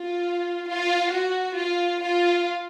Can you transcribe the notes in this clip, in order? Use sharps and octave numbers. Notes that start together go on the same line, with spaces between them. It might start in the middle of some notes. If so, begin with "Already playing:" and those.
Already playing: F4
F4
F#4
F4
F4